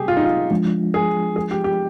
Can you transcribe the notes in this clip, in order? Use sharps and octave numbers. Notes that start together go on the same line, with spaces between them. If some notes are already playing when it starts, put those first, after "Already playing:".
Already playing: C3 G3 G4 G#4
F4
D#4
F4
F3 G#3 D4 F4
G#4
G#4
G4
G4